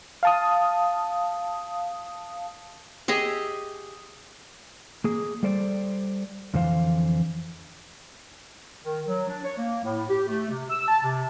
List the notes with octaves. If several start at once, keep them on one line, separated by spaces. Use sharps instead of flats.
F5 A5 D#6
G4 G#4 D#5 E5
A#3 G#4
G3 A4 C5 D5
F2 D3 E3 C5 F5
D#3
F#3
D4
C#5
A#3
A2
G4
A3
C3
E6
A5
C3